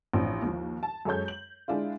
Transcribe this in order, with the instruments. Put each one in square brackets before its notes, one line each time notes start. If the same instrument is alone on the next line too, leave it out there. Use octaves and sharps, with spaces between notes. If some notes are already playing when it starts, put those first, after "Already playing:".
[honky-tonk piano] A1 F3 C4 D4
D#2 F3
A5
F#2 G#3 A4 C#5 G6
F#7
G#3 D4 E4 F4